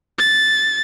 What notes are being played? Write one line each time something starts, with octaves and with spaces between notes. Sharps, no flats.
A6